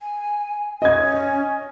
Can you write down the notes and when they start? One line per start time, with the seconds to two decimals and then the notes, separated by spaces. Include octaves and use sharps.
0.01 G#5
0.82 C#4 D#5 G#6